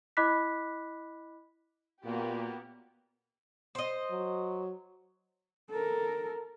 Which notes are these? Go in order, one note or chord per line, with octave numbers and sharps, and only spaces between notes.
E4 D#5 B5 D6 F#6 B6
F#2 A#2 A#3 B3 F#4 G4 A#4
C5 D#5
F#3
A4 A#4